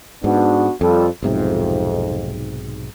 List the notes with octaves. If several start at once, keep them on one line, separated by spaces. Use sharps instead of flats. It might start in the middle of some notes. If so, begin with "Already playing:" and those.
G#2 B3 D4 F#4
F2 G3 F4 A4
B1 F2 G#2 C3